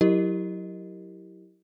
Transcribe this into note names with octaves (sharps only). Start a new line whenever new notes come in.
F#3 E4 G4 A#4 D#5